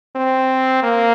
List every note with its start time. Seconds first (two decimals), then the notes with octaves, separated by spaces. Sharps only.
0.15 C4
0.83 A#3